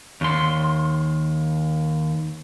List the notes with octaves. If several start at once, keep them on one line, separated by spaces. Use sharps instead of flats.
D#2 C6